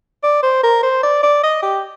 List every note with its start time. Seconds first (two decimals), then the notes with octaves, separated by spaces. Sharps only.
0.23 D5
0.43 C5
0.63 A#4
0.83 C5
1.03 D5
1.23 D5
1.43 D#5
1.63 G4